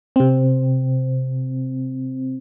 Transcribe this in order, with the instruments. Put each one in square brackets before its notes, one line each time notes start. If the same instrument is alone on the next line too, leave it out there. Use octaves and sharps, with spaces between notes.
[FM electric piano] C3 C4